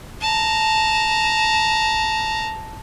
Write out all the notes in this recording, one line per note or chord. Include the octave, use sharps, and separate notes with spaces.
A5 A#5